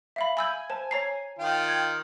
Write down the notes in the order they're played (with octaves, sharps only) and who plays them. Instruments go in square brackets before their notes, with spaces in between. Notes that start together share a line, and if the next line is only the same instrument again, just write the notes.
[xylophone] E5 F5 B5
[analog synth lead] G#5 [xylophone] B5 E6 G6
[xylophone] C5 A5
C#5 A#5 C7
[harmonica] D#3 F4 [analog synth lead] G5
[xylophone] G#6